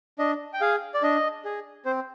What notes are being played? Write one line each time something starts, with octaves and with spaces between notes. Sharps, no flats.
D4 D#5
G5
G#4 F5
D5
D4 D#5
G#4
C4 C5